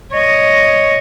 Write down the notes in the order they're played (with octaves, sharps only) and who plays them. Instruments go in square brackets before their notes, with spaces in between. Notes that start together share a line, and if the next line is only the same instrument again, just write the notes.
[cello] C#5 D#5